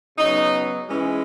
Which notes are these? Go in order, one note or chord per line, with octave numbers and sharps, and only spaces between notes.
C#3 F#3 B3 D#4
G#2 E3 G#3 C#4